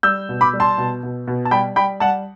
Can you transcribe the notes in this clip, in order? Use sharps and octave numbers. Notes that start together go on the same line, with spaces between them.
G3 E6 G6
B2
B5 D6
G3
A5 C6
B2
B2
B2
A5
G3 G5 B5
G3 G5 B5
G3 F#5 A5